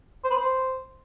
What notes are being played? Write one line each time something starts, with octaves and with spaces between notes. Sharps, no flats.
C5
B4
C5